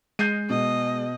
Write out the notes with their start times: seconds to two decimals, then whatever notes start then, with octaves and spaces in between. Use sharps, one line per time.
0.19 G#3 G6 C7 D#7
0.50 B2 D#5